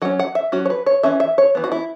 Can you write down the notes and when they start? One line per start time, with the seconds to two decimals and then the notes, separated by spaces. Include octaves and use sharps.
0.02 F#3 C#4 F#5
0.19 F#5
0.35 E5
0.52 F#3 C#4 F#4
0.66 C#5
0.70 B4
0.86 C#5
1.03 E3 C#4 E5
1.20 E5
1.38 C#5
1.55 E3 B3
1.64 F#4
1.72 E4